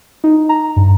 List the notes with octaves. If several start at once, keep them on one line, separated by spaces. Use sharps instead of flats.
D#4
A#5
G2